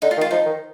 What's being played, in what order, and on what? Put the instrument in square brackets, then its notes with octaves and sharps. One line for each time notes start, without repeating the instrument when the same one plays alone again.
[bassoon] D3 [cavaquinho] D#4
[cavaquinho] F4
[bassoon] D#3
[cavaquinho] F4
[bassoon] F3 [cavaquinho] D#4
[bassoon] D#3